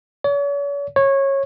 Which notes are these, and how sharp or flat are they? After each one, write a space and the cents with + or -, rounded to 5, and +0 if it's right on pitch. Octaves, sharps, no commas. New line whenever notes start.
C#5 +40
C#5 -20